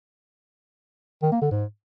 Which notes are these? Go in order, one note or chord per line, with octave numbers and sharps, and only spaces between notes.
D#3
A#3
D3
G#2